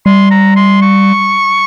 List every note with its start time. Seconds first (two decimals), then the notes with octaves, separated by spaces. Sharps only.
0.06 G3 C6
0.31 A#5
0.56 C6
0.82 C#6